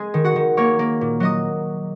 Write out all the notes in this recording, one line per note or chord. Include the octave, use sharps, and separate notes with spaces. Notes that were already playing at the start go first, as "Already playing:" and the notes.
Already playing: G#3 C4 G#4 G#5
D#3
F#4 F#5
D#3
A#3 C#5 C#6
A#3
A#2
F#3 D#5 D#6